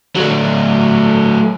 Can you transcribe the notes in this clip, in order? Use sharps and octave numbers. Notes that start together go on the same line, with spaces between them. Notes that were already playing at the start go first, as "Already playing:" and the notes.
F#3 A3